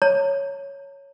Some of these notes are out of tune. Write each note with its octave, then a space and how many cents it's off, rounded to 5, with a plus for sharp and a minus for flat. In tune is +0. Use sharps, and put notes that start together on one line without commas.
C#5 +0 A#5 -45